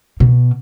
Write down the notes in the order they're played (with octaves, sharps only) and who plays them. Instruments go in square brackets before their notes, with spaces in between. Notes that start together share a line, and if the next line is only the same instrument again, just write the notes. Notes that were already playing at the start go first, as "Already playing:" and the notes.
[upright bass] B2